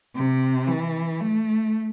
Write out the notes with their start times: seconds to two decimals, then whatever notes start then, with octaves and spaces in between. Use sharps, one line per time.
0.15 C3
0.68 E3
1.20 A3